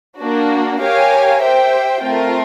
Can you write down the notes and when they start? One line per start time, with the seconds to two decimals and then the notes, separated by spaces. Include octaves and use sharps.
0.19 A#3 D4 F#4
0.81 G4 A#4 C#5 F5 G#5
1.43 G4 C5 E5 G5
2.05 A3 C4 F4 A#4